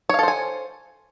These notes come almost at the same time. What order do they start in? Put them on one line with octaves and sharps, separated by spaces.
C#5 F5 A4 C5 G#5